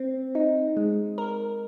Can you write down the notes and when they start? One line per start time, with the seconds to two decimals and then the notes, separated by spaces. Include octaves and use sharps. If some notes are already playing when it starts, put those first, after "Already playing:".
Already playing: C4
0.35 D#4
0.77 G#3
1.18 A#4